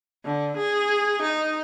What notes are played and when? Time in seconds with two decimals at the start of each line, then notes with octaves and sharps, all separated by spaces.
0.25 D3
0.57 G#4
1.22 D#4